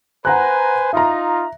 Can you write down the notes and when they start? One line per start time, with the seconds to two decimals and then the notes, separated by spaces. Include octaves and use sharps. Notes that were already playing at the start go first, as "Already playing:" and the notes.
0.25 B4 C5 F#5 G#5 A#5 F#6
0.93 D#4 F4 E5 A#5